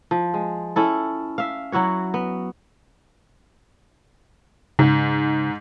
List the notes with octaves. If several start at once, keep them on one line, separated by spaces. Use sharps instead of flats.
F3
G#3
C#4 E4 A4
E5 F5
F#3 E4 F#4 C#5
B3
G#2 C#3